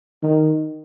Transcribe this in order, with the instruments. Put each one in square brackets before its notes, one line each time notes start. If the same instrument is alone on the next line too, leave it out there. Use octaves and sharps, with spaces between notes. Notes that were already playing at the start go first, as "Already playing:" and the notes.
[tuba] D#3